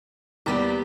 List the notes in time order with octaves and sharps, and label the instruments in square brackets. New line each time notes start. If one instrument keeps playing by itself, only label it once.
[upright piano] E2 G3 D6 [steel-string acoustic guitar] A#3 B3 G4